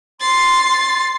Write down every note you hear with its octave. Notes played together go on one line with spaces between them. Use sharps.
C6 A6 C7